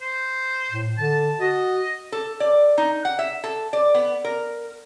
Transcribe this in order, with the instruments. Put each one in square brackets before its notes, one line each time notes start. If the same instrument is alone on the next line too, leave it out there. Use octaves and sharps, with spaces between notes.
[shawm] C5
[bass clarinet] A2
[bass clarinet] D3 [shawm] A5
[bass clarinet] F#4 [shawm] D#5
[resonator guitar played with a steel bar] A4
D5
D#4
F#5
E5
A4
D5
B3
A#4